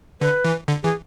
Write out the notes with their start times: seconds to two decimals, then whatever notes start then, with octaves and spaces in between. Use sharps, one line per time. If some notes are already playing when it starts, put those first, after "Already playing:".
0.21 D3 B4
0.44 E3
0.68 D3
0.83 E3 G#4